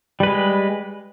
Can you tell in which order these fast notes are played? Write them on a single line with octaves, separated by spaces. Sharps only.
G3 B4 G#3